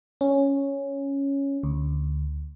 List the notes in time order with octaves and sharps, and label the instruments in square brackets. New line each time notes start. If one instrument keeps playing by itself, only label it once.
[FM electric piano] C#4
D2